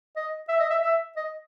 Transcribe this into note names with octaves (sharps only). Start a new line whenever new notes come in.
D#5
E5
D#5
E5
E5
D#5